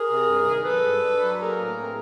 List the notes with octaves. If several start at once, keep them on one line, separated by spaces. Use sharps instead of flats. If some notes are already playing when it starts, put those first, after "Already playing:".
Already playing: G#4 A#4
C3
G2
D#3
F#3 A4 B4
G2
D4
F#3
A#3 G#4 A#4
A2
C4